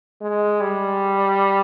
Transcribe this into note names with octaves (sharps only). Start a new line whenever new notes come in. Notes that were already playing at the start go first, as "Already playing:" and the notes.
G#3
G3